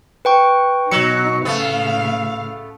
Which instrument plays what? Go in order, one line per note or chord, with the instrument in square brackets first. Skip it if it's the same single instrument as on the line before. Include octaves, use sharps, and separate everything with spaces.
[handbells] B4 G5 C#6
[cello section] B2 D#4 [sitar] F#3 [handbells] C#7
[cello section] A2 C#3 F5 [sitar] A3 B3